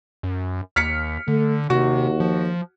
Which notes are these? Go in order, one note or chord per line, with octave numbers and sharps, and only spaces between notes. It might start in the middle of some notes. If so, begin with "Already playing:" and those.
F#2
D#2 F6 B6 C#7
D3 A3
D#2 C3 F#4
F3